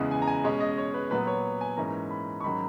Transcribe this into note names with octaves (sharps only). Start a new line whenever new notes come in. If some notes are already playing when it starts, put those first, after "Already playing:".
Already playing: E2 C#3 E3 G#3 B3 F#5
G#5
A#5
G#5
B2 G#3 C#4
D#5
C#5
B4
A#2 F#3 B3 B4
C#5
G#5
G#2 E3 A#3 C#4 A#5
B5
C#6
G#2 D#3 F#3 C#4 B5